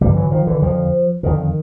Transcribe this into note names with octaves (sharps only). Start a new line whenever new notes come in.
G2 D3 F3 G3
E3 F#3
D#3 F3
D3 E3
F2 D3 D#3 F3
F2 D3 D#3